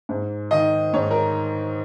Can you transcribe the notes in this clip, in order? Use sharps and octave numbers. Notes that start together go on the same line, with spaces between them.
G#2
D#3 D#5
G#2 C#5
A#4